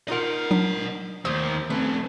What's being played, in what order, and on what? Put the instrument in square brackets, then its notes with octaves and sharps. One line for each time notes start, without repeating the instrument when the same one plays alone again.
[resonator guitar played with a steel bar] D#4 F4 A#4 [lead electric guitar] D#5 F#5
[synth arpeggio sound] F#3 D4 B6
[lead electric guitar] D#2 [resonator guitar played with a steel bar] A3 C5 [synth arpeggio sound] D#6
[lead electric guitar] A3 C4 [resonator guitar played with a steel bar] C#4 B4